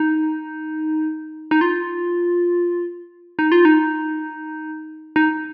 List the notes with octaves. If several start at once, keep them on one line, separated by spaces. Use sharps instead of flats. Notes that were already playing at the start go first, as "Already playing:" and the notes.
Already playing: D#4
D#4
F4
D#4
F4
D#4
D#4